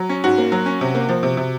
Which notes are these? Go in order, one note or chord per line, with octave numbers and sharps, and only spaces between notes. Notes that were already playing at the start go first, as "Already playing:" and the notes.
Already playing: F#3
C#4
G#2 F#4
A#3
F#3
C#4
C3
A#3
F3
C3
C3